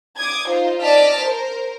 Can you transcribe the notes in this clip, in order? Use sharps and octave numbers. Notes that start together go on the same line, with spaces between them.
D6 D#6 G#6
D#4 F4 C5
D5 D#5 A5 F6 B6 D7
A#4 C5